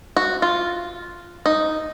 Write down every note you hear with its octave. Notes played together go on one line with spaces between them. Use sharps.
F#4
F4
D#4